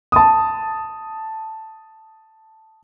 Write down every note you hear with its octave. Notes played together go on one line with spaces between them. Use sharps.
A5 D#6